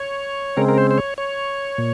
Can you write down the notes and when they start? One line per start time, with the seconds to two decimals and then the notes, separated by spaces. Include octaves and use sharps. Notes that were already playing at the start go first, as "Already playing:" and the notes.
Already playing: C#5
0.57 C#3 G#3 C4 A#4
0.69 A#4
0.78 C5
0.91 C5
0.98 C#5
1.18 C#5
1.78 A#2